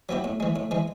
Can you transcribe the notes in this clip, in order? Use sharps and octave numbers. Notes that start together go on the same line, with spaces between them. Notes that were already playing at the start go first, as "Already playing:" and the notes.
F#3 B3 E4 G4
A2
E3 G#3
A2
E3 G#3